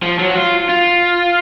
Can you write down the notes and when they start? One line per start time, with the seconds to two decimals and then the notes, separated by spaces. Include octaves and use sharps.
0.03 F3
0.19 F#3
0.31 F#4
0.35 F4
0.69 F4